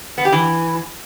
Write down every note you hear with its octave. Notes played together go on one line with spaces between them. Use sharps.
B3
G4
E3